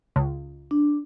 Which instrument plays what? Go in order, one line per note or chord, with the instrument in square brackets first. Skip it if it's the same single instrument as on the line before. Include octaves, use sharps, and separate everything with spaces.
[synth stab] C#2
[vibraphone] D4